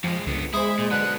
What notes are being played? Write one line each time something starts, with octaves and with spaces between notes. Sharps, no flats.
F2 F3 G#3
C#2 D3 B3
G#3 E4 G#4 C5
A#2
D3 F#3 B3 F#6